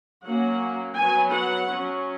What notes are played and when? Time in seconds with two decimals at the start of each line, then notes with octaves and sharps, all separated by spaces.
0.24 F#3 A#3 C#4 F#5
0.96 F#3 B3 G#5
1.31 F#5
1.68 F#3 C#4